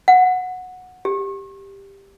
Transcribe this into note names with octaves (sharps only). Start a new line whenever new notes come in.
F#5
G4